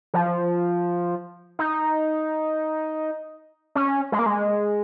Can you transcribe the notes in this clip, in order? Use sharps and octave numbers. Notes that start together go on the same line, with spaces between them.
F3
D#4
C#4
G#3
A#3
G#3